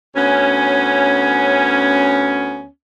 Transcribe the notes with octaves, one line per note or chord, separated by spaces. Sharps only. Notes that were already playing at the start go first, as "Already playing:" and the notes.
D2 B3 C#4